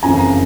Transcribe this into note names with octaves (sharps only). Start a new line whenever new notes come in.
F#1 F2 C#3 E3 G#5 A#5